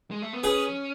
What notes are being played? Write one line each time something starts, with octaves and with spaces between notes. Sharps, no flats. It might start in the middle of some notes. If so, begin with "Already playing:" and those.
G#3
A3
B3
C#4 G#4 B4